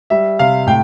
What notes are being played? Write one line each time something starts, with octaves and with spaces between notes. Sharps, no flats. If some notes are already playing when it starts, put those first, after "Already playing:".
G3 E5
C3 F5
A2 G5